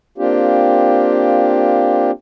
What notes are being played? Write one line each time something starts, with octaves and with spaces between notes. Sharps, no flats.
A#3 C4 D4 F4 G4